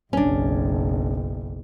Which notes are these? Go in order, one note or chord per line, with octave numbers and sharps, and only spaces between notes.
F#1 B1 C#4 D4